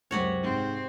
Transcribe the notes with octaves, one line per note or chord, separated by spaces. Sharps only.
C#2 F#2 C3 F#4 C#5
G#2 C4